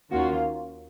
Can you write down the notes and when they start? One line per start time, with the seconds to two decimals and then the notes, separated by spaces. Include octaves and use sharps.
0.11 D#2 D#3 A#3 C#4 F4 F#4